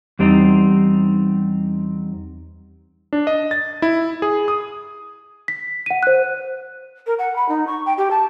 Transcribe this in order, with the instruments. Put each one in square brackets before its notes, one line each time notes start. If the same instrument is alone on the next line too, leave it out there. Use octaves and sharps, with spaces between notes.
[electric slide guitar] E2 G3 C4 D#4
[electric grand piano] D4
D#5
A6
E4
G#4
D#6
[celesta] B6
F#5 D#7
C5 F#6
[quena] A#4
F#5
B5
D#4
C#6
G5
G4
A5